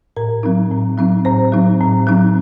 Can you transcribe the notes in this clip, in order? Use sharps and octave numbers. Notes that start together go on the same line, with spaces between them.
A2 A#4
F#3 C4 D#4
A2
F#3 C4 D#4
A2 C5
F#3 C4 D#4
A2
F#3 C4 D#4